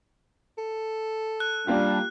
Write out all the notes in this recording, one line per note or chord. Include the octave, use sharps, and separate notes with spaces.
A4
F#6
G3 A#3 D4 F4 G4